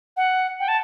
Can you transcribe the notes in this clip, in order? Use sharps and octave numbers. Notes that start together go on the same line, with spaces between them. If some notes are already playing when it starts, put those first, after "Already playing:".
F#5
G5
A5